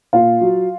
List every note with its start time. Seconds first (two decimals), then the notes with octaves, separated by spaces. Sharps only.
0.13 A#2 F4 F5
0.41 F#3